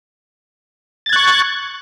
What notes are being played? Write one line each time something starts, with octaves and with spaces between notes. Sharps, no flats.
C#6 F#6 G#6 A6